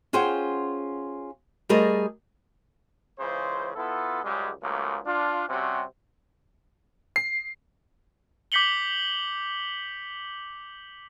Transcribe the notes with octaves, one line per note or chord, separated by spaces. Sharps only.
C#4 F4 G#4 C5 F#5 G5
G3 A3 G#4 A#4 C5 D#5
C#2 C#3 E3 C5
B3 E4 F4 A4
C#2 F#2 G3 G#3
C#2 G#2 F#3 A3 A#3
D4 F4
C3 G3 C4 C#4 F#4
C7
D6 G6 B6 C#7 F#7 G7